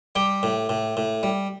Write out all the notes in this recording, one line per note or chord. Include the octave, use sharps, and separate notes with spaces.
G3 G4 G5
A2
A2
A2
G3